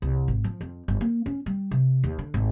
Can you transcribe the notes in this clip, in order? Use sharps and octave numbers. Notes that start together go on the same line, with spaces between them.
C2
G#1
F3
F2
G1
A#3
C#4
G3
C3
D#2
D3
G#1